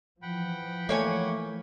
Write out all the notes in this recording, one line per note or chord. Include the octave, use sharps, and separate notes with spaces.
E3 F3 F#5 G5 B5
A3 A#3 C#5 G#5